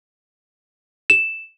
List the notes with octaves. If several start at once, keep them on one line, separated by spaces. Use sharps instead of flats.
E7